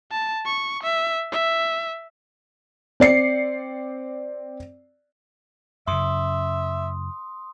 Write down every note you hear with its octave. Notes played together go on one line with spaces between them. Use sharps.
A5
C#6
E5
E5
C4 D5 C7 C#7
F#2 C#3 E5 C6 D#6